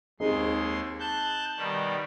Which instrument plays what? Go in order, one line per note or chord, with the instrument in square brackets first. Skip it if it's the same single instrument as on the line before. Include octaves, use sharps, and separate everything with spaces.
[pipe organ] D#2 G#3 C6 [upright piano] C4 D#4 G#4
[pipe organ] A5 F#6 G6
B2 D#3 G3